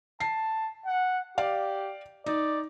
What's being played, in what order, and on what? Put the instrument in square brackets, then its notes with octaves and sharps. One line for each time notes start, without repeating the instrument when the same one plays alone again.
[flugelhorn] A5 [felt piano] C7
[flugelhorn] F#5
[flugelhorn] G4 [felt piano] D5 F5
[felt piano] D#4 [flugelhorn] D5